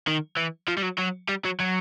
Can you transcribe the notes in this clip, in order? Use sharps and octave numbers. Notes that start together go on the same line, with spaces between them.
D#3
E3
F3
G3
F#3
F#3
G3
F#3
F#3